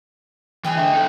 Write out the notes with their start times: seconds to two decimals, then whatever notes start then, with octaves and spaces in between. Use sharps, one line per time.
0.64 E3 G#4 D#5 G5 G#5
0.77 D3 E5
0.94 D#4 A4